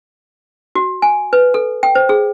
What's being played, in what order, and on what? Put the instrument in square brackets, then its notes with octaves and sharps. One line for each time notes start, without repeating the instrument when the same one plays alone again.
[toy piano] F#4
G#5
B4
A4
G5
C5
G#4